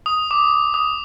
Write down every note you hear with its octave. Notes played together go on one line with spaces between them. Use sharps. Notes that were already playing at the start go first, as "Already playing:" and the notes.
D#6
D6
D#6